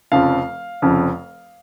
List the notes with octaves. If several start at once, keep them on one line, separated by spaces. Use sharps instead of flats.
F1 F2 C#3 F3 F5
F1 F2 C#3 F3